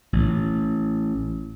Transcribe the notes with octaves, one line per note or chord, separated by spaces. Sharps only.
A1